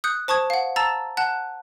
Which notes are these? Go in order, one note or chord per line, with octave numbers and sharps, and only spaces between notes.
D#6 F#6 G6 C#7
C5 A5 C#6 D#6 G#6
F5 F#5
A5 A#5 E6 A6
F#5 A5 F#6